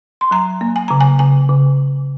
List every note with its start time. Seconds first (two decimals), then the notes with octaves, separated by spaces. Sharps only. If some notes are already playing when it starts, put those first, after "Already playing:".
0.21 C6
0.31 F#3 A#5
0.61 A#3
0.76 G#5
0.88 C#3 A#5
1.01 G#5
1.19 C#3 G#5
1.49 C#3